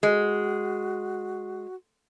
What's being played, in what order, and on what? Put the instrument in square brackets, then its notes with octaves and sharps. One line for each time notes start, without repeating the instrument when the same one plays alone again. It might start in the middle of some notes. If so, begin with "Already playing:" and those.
[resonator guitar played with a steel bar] G#3 [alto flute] F#4